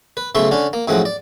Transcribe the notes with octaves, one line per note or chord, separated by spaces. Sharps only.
B4
B1 C#3 A3 E5 C6 C#6
D3 C#4 D4
A#3
F#2 A2 F3 G#3 F#5
D5